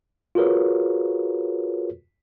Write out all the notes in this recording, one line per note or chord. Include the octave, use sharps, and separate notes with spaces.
F4 F#4 G#4 A#4 B4 C#5